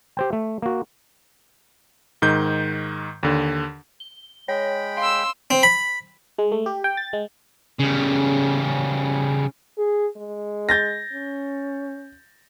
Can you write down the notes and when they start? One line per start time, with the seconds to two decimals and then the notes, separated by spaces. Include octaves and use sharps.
0.17 G4 C5 G5
0.33 A3
0.62 A#3 F#4
2.22 G#2 D#3 G6
3.23 D#2 D3
4.00 G7
4.48 G#3 C#5 G5 B5
4.97 F5 C6 E6
5.51 C4
5.63 B5
6.39 G#3
6.52 A3
6.66 G4
6.84 G5
6.97 A6
7.13 G#3
7.80 C#3 G3
9.78 G#4
10.17 G#3
10.69 G6 A6 A#6
11.13 C#4